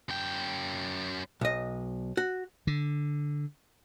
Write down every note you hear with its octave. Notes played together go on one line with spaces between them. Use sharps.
F#2 G5
B1 D#5
F#4
D3